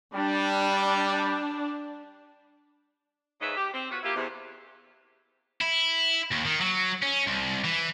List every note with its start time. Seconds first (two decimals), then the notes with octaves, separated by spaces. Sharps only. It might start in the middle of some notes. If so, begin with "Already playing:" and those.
0.15 G3 D4
3.41 G#2 C#3 B4 D#5 E5
3.57 G4
3.74 C4
3.91 B2 F4 F#4 B4 C#5
4.03 A#3 E4 F4 G4
4.16 E2 C3
5.61 E4
6.31 D#2
6.45 D#3
6.60 F#3
7.03 C#4
7.27 C2
7.64 E3